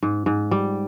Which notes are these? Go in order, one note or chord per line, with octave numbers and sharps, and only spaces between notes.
G#2
G#2
G3